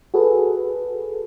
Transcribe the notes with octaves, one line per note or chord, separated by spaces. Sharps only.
F#4 G#4 A4 B4